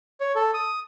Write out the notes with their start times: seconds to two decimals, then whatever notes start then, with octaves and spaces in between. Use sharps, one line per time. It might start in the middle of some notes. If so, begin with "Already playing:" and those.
0.20 C#5
0.35 A4
0.54 D#6